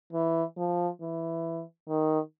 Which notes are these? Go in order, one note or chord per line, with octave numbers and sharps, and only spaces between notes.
E3
F3
E3
D#3